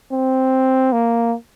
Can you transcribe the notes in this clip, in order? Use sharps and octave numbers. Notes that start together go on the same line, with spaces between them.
C4
A#3